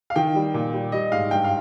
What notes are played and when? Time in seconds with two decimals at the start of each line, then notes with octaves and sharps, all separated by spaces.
0.10 F5
0.16 D#3 G5
0.35 G3
0.54 A#2
0.73 G3
0.92 G3 D#5
1.12 G#2 F5
1.31 G2 G5
1.44 F5